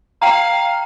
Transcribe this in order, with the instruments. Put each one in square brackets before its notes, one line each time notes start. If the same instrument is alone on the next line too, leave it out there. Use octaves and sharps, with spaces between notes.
[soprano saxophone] F5 [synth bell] G5 A#5